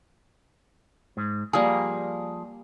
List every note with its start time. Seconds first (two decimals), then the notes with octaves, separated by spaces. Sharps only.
1.17 G#2
1.53 F3 G3 A#3 G#4